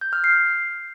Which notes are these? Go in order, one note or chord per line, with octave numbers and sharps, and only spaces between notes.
G6
F6
C7